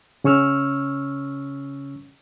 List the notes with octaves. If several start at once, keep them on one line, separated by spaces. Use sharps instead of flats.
C#3 C#4 C#6 E6 F6